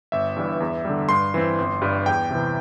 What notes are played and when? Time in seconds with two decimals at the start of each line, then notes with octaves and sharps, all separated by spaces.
0.12 G1 E5
0.36 G2 E3 G3
0.60 E2
0.85 D3 G3
1.09 G2 C6
1.34 E3 C4
1.58 G1
1.81 G2 G3
2.06 E2 G5
2.31 C3 E3